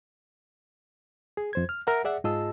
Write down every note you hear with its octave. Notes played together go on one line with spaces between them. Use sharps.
G#4
F2 C5 G#6
F6
A#4 E5 F#5
G#4 D5 E5 F#5
G#2 F4 G#4 D#5 A5 E6